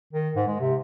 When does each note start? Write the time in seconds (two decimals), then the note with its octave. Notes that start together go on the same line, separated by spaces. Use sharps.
0.13 D#3
0.36 G#2
0.47 G#3
0.60 C3